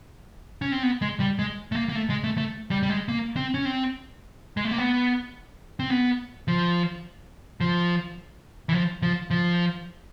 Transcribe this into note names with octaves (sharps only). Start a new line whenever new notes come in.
C#4
C4
B3
G#3
G3
G#3
A3
A#3
A#3
A3
G#3
A3
A3
G3
G3
G#3
A#3
C4
C#4
C4
G#3
A3
A#3
B3
C4
B3
F3
F3
E3
F3
F3
F3